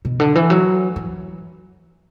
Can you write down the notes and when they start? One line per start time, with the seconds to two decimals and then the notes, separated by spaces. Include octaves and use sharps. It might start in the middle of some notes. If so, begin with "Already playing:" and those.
0.05 B2
0.20 D3
0.35 E3
0.50 F#3
0.96 E3